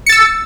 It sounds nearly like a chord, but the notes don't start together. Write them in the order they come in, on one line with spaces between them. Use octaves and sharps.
C#7 A6 E6